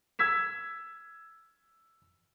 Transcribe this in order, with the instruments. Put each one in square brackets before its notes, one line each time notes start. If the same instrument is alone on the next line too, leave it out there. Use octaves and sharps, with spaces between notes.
[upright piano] E6 G#6 B6 E7